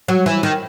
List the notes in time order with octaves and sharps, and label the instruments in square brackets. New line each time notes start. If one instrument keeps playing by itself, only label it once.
[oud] F#3
E3
D#3